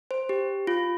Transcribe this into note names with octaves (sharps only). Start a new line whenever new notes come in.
C5
G4
F4